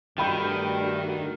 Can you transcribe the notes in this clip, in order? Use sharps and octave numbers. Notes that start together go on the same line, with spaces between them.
G2 D#3 A3 D4 F#4 G5 B5 G6